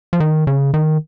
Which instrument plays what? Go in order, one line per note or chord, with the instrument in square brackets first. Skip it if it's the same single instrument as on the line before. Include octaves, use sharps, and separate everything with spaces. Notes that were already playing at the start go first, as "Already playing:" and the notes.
[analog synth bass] F3
D#3
C#3
D#3